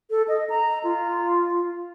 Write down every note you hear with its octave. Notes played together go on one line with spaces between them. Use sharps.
A4
D#5
A#5
F4